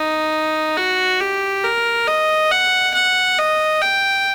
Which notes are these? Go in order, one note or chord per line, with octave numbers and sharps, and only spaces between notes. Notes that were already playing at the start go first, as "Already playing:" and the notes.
Already playing: D#4
F#4
G4
A#4
D#5
F#5
F#5
D#5
G5